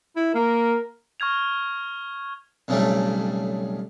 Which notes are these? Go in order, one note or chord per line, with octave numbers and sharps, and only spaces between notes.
E4
A#3 A#4
C#6 F6 G#6 F7
B1 F2 C#3 E3 G3 A3